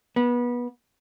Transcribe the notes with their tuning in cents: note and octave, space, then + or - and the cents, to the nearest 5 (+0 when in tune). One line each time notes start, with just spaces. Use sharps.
B3 -25